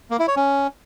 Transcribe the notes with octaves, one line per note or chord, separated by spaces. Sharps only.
A#3
E4
C#5
C#4